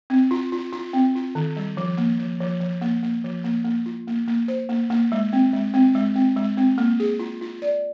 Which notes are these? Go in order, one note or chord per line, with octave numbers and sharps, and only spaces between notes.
C4
F4
F4
F4
C4
F4
D#3
G3
F3
A#3
F3
F3
F3
A#3
A#3
F3
A#3
A#3
F4
A#3
A#3
C5
A#3
A#3
G#3
C4
G#3
C4
G#3
C4
G#3
C4
A#3
G#4
F4
F4
D5